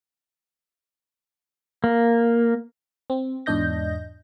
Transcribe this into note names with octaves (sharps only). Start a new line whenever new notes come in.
A#3
C4
E2 G#2 D4 D#5 G6 A#6